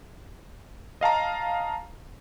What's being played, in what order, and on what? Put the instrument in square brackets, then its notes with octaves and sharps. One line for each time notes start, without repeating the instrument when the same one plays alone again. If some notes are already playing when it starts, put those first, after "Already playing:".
[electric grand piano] D#5 F5 A5 A#5